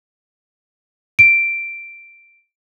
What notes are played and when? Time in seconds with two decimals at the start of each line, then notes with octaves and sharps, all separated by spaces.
1.19 D7